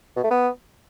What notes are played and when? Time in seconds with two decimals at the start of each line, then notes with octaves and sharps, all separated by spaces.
0.17 B2
0.24 A3
0.31 B3